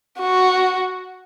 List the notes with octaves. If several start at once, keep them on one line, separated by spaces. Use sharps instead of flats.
F#4